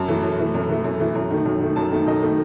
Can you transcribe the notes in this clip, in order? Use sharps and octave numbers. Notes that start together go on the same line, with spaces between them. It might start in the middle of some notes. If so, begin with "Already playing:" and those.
Already playing: F#2 A5
E3 A3
F#2
E3 A3
F#2
E3 A3
F#2
E3 A3
F#2
D#3 A3
F#2
D#3 A3
F#2 A5
D#3 A3
F#2 D#5
D#3 A3